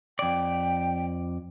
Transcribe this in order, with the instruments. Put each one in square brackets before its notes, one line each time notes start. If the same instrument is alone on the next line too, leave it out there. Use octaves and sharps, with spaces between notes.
[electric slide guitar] F2 D5 [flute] G5